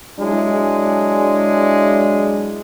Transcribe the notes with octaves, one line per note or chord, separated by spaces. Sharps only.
F#3 G#3 D4 E4